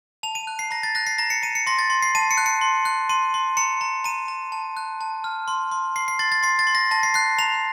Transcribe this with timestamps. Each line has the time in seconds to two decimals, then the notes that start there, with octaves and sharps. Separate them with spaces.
0.23 A5 F7
0.35 D#7
0.47 F#6
0.59 C7
0.71 A#5 A#6
0.83 A6
0.95 F#6 A#6
1.07 C7
1.18 A#5 A#6
1.30 C#7
1.43 A#5 D#7
1.55 C#7
1.67 C6 A#6
1.79 A6
1.90 C6
2.02 C7
2.15 A5 D#7
2.31 C#7
2.38 F#6
2.46 C#7
2.61 C6
2.85 F#6
3.09 C6 D#7
3.34 C6
3.57 A#5 C#7
3.81 A#5
4.04 A#5 D#7
4.28 A#5
4.52 A5
4.77 F#6
5.01 A5
5.24 F6
5.48 C6
5.71 C6
5.96 C6 C7
6.08 C7
6.19 C6 A6
6.32 A6
6.43 C6 C7
6.59 A6
6.67 C6
6.75 A#6
6.91 A5 A#6
7.03 C7
7.14 F#6 C7
7.39 A#5 F7